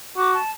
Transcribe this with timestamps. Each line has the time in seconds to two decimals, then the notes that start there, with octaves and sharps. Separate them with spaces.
0.17 F#4 D6
0.33 A5